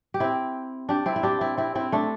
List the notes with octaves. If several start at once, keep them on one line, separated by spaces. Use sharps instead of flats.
G4
C4 E4
D4 G4
C4 E4
E4
D4 G4
C4 E4
C4 E4
C4 E4
A3 D4